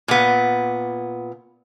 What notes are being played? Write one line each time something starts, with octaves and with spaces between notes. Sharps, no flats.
A#2 B3